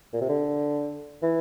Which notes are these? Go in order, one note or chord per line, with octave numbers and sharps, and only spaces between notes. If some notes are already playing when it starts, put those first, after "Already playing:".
A#2
C3
D3
E3